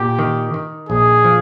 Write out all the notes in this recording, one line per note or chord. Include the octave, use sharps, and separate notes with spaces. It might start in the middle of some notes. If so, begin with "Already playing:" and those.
Already playing: A#2 G4
D#3
D#3
A#1 G#4
F3